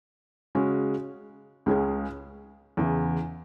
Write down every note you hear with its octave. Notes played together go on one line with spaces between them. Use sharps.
C#3 G#3 C#4 F#4
C#2 C#3 G#3 C#4 G#4
E2 C#3 E3